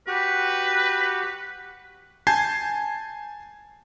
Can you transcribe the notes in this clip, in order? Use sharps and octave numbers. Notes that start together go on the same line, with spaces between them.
F#4 G4 B4
G#5 A5 G6 G#6 C7